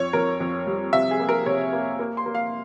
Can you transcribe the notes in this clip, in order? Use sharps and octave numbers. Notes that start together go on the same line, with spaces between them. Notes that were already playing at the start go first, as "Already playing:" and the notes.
Already playing: F2 C#5
F2 A#4
F2
G3
C3 E5
G#4
A#3
A#4
C3 C#5
A#3
A#3
C6
A#3
F5